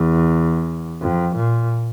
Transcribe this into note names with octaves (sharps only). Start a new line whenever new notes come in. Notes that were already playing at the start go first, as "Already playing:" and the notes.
Already playing: E2
F2
A#2